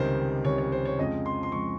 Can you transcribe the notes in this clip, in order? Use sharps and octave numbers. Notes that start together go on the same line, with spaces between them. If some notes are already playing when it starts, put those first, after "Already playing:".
Already playing: C#2 C3 D#3 G3 C5
C#2 C3 D#3 G3 C#5
C#5
C5
C#5
F2 C#3 F3 G#3 D#5
C6
C6
C#3 F3 G#3 C#6